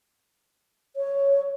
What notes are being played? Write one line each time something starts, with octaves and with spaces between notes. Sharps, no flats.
C#5